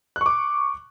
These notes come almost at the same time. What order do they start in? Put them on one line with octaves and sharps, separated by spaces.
F#6 C#6 D6